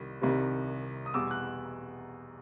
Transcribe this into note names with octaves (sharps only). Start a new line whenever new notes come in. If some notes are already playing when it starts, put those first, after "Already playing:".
Already playing: C2 C3 D#3 G3
C2 C3 D#3 G3
D#6
E2 B2 G3 D6 E6
F#6